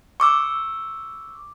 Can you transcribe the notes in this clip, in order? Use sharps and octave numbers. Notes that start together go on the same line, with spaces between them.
C#6 D6 E6